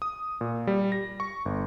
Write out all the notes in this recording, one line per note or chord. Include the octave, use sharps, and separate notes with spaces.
D#6
A#2
G3
A#6
C#6
G1